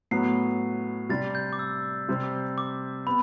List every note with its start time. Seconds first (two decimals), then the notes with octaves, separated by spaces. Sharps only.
0.11 A2 F#3 B3 C7
1.09 C3 G3 D4 A6
1.35 G6
1.53 D6
1.59 E6
2.09 C3 G3 C4
2.58 D6
3.06 B3 B5